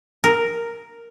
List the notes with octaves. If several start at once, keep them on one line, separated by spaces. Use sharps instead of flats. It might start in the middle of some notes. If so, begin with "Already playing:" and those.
A#4